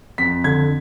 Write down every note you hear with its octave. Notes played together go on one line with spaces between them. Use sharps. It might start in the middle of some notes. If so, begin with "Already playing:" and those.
F2 B6
D3 G#6